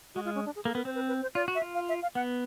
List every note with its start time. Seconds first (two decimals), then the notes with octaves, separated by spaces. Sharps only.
0.15 G#3 F#4
0.25 F4
0.35 C#4
0.46 D4
0.55 G#4
0.65 A#3 A4
0.75 B3 A#4
0.85 C4 C5
0.95 B4
1.08 B4
1.22 C5
1.35 F4 D5
1.48 F#4
1.55 E5
1.62 F4
1.75 F5
1.89 E5
2.02 F5
2.15 B3 F#5